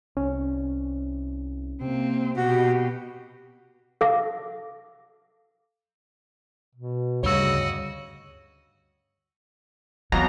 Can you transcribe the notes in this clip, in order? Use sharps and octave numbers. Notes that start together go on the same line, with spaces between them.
C2 C#4
C3 A#3 C4
B2 F#4 G4
A4 F5 D6 A#6
B2
D2 G2 C#3 F#4 C#5 D#5 E6
F2 B2 E3 F#3 A#5